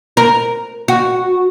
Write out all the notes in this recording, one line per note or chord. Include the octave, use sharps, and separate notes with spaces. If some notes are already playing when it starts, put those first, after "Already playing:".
A#4
F#4